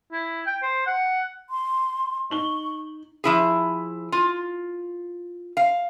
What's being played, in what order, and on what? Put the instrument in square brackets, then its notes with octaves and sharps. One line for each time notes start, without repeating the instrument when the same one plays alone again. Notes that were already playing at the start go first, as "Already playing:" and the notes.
[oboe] E4
G5
C5
F#5
[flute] C6
[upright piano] D#4 F#7 G7 [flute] C#6
[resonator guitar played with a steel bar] F3 E4 G#4
F4
F5